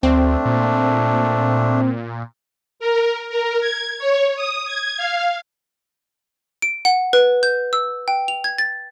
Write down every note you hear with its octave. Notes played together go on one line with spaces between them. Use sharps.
D2 A3 C4 D4
A#2
A#4
A#4
G#6
C#5
D#6
G#6
F5
D7
F#5
B4
G6
E6
G5
F7
G#6
A6